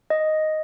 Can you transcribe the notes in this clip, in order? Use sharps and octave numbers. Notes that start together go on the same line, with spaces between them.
D#5